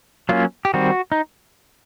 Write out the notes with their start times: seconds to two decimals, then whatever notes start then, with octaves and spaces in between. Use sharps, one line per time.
0.29 F#3 A#3 C#4 F4
0.65 G4
0.74 D#3 G3 C4 F#4
1.12 D#4